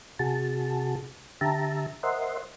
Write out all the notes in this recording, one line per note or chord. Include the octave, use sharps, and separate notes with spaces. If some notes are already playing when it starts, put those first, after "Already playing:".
C3 F#4 G#4 A5
D3 G4 E5 A5 A#5
A#4 C5 D#5 E5 F#5 C6